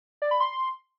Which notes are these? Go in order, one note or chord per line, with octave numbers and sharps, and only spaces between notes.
D5
B5
C6